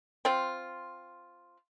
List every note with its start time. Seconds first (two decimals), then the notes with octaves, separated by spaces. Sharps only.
0.25 C4 F4